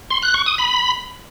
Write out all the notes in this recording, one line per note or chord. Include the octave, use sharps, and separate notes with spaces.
C6
F#6
C#6
D#6
B5